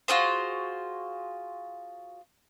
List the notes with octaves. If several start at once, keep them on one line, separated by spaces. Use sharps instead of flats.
F4 F#4 G#4 C5